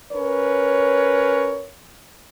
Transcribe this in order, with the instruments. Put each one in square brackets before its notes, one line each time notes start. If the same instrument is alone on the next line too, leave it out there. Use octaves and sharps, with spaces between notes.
[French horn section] C#4 A#4 B4 C#5